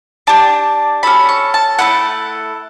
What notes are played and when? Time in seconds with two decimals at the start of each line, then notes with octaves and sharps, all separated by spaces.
0.27 D4 G4 A5
1.03 C#4 F#4 A4 B5
1.29 C#6
1.54 A5
1.79 A3 E4 A4 F#5